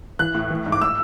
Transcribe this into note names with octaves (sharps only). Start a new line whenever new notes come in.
E3 F#6
A2
E3
G#2
D6
E6